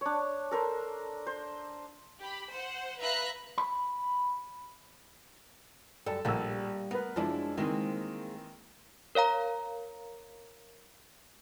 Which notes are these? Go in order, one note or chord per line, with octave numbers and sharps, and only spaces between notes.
D4 C#5
A4 A#4 C5
C5
G4 B5
C5 F#5
B4 E5 F5 A#5 B5 F#6
B5
F#2 G3 A4
A#1 G3 A#3 F#5 E6
B3 A#4 B4
F#2 F3 G#3 D4 E4
D#3 E3 G#3 A#3 C4 C5
A#4 C#5 F5 A#5